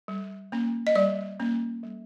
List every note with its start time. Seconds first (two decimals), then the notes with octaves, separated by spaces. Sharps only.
0.08 G3
0.52 A#3 C#4
0.87 D#5
0.95 G3 D5
1.40 A#3 C#4
1.83 G3